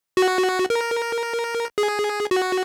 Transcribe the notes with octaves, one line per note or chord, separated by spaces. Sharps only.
F#4
A#4
G#4
F#4